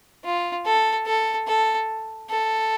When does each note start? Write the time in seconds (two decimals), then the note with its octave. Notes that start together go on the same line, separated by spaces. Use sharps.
0.25 F4
0.66 A4
1.07 A4
1.48 A4
2.30 A4